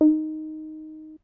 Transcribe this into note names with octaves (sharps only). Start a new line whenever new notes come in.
D#4